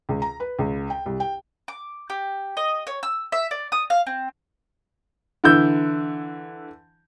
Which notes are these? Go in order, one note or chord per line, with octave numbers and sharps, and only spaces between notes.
C#2
A#5
B4
C#2
G5
C2
G5
D6
G4
D#5
C#5
E6
E5
D5
D#6
F5
C4
D3 E3 E4 E6 G6